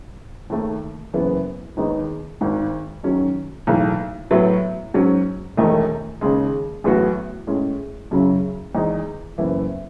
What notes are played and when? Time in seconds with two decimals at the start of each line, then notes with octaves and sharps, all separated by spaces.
0.50 D#2 D#3 A3
1.14 F#1 F#2 E3 B3
1.77 D#2 D#3 G#3 B3 D#4
2.41 G#1 G#2 D#3
3.03 F#2 D#3 F#3 C#4
3.67 B1 A2 E3
4.31 A2 F#3 B3 E4
4.94 G#2 F#3 C#4
5.57 E1 E2 D#3 A3 D#4
6.21 D#2 C#3 G#3
6.84 A1 A2 F#3 B3 F#4
7.47 A2 G#3 C#4
8.11 F#2 C#3 F#3 C#4 E4
8.75 E2 D#3 G#3 D#4
9.38 F#1 F#2 E3 B3 E4